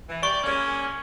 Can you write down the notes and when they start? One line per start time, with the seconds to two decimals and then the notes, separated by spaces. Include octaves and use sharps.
0.08 E3
0.23 G3 G4 D5 C#6
0.43 G#3 A#3 C#4